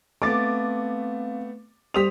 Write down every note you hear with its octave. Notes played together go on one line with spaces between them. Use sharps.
A3 B3 C4 F5 D6 A6
G3 C5 D#6 B6 F7